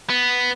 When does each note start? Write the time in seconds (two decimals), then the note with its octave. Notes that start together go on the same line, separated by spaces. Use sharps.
0.10 B3